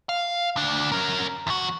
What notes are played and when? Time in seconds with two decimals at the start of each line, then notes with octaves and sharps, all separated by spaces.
0.09 F5
0.56 D2 D4
0.92 C#4 A#4
1.47 E2 F#4